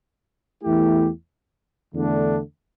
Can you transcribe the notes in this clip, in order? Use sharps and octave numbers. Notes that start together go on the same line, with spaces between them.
E2 E3 A3 E4 G4
E2 D3 A3 D4